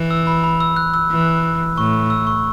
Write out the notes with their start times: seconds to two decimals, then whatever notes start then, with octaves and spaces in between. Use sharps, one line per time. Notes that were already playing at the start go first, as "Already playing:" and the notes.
Already playing: E3
0.11 E6
0.27 B5
0.44 B5
0.60 E6
0.76 F#6
0.94 E6
1.11 E3
1.77 A2 C#6
2.10 E6
2.27 C#6